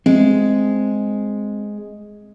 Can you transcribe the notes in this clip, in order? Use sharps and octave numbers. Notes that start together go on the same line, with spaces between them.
G#3 C4